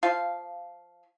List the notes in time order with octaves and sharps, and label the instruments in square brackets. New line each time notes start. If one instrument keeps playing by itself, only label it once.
[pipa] F3 F4 F5